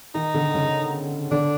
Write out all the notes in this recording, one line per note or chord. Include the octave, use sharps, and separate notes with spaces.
D#3 D#4
D3
C#3
D3 D4